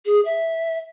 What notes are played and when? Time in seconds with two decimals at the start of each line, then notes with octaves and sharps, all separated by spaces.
0.06 G#4
0.25 E5